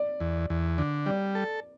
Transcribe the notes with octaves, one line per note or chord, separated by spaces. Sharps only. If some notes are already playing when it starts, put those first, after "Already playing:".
Already playing: D5
E2
E2
D3
G3 D5
A4